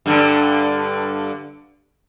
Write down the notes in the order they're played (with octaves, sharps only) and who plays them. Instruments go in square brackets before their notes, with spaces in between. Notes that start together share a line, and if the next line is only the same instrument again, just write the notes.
[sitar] G2 D3